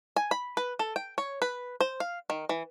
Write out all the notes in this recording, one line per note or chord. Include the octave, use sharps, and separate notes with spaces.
G#5
B5
B4
A4
G5
C#5
B4
C5
F5
D#3
E3